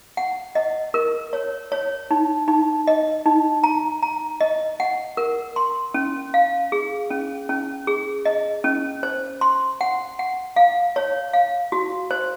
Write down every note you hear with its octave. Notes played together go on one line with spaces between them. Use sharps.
F#5
D#5
A#4
C#5
C#5
D#4
D#4
D#5
D#4
A#5
A#5
D#5
F#5
A#4
C6
C#4
F5
G#4
C#4
C#4
G#4
D#5
C#4
C5
C6
F#5
F#5
F5
C#5
F5
F#4
C5